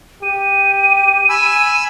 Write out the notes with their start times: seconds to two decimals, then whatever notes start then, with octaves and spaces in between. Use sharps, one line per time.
0.22 G4 D#7
1.29 G#5 B5 E6